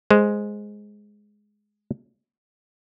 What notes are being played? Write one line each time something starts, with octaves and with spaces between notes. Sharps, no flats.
G#3 C5